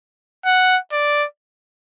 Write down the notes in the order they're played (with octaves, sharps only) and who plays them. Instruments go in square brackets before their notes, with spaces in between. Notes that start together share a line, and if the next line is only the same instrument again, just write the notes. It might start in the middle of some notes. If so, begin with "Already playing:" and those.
[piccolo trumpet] F#5
D5